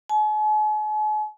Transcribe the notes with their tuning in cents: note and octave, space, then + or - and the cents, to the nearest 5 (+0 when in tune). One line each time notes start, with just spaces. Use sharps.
G#5 +45